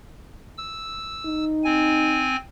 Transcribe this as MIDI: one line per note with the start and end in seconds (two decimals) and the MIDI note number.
0.58 1.45 88
1.26 2.30 63
1.64 2.36 60
1.64 2.36 80